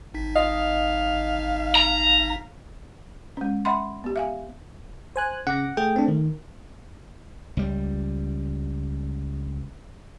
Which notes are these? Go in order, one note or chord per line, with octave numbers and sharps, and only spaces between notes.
G#1 D#4 B6
D#5 F5
A#5
G#3 C#4
D#5 E5 F#5 B5 C6
B3 G4
E5 F5 G#5
C5 G#5 F#6
C#3 F#5 D6 A#6
A3 G#4 G5
C4 D4
D#3
C#2 G3